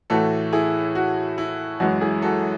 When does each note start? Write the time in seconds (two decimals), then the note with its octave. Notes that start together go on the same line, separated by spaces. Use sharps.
0.10 A2 E3 A3 F#4 A4
0.53 E4 G#4
0.95 F#4
1.38 E4
1.80 F#2 E3 G#3 F#4
2.01 E4 G#4
2.22 F#4 A4